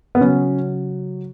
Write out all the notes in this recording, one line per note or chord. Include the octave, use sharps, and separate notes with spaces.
B3
C#3 F#3 C#4